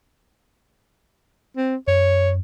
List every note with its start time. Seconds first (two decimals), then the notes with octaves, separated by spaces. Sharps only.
1.57 C4
1.88 F#2 C#5